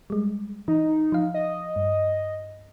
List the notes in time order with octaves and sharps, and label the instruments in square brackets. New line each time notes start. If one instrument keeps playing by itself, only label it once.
[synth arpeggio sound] G3 G#3
[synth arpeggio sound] E3 [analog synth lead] D#4
[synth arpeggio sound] F3 F5
[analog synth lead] D#5
[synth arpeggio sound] G2